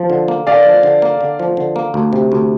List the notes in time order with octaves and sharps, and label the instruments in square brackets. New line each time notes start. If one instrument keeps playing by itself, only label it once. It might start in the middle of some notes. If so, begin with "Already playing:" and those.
Already playing: [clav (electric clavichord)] F3
D3
A#3
[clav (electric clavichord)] D3 [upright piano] D5 F5
[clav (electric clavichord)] F3
D3
A#3
D3
F3
D3
A#3
D2
C3
D2